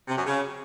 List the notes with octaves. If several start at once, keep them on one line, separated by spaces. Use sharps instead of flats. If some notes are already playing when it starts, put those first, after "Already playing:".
C3
F#2
C#3